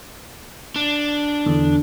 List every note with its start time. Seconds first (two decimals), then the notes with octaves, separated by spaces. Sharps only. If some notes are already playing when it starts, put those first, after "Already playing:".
0.76 D4
1.46 E2 D3